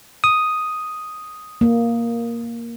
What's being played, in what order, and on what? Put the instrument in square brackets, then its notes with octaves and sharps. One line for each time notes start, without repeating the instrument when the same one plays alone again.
[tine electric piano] D#6
[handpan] A#3